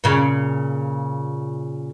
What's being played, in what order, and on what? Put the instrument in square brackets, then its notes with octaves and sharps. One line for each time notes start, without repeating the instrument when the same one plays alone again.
[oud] A#2 C#3